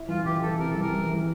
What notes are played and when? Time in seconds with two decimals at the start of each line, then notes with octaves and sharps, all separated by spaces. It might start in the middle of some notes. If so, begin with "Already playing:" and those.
Already playing: E4
0.08 E3 F4
0.25 E3 G4
0.42 E3 A4
0.59 C3 A#4
0.69 A4
0.75 E3
0.81 A#4
0.92 E3
1.09 E3